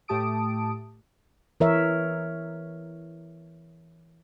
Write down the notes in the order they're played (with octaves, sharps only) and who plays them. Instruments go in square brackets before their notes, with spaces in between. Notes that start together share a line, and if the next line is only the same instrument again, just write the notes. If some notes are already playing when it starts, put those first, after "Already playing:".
[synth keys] A2 A3 G4 A5 D#6 D7
[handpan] E3 A#4 C#5 E5